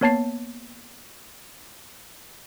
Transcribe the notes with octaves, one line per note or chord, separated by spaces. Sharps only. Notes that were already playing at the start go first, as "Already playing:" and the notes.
A#3 B3 C#5 A5 A6 C7